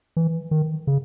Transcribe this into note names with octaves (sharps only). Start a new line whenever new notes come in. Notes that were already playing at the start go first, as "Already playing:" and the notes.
E3
D#3
C#3